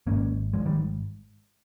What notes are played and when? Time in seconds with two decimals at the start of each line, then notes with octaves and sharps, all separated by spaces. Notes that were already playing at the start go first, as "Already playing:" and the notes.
0.07 G#1 G#2 A#3 C#4
0.53 G#1 G#2 F3 G#3
0.65 D#3 G3